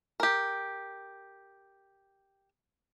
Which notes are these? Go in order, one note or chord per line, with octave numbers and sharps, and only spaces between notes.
G4 A#4